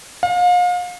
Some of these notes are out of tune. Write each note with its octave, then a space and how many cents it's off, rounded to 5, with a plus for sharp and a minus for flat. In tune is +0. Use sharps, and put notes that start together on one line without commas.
F5 +35